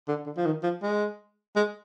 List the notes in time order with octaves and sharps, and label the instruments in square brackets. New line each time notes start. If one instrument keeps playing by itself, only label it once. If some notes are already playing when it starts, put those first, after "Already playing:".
[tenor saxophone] D3
D3
F3
D#3
F3
G#3
G#3